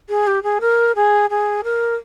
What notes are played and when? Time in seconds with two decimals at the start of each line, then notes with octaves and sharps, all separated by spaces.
0.09 G#4
0.27 G4
0.43 G#4
0.61 A#4
0.96 G#4
1.30 G#4
1.64 A#4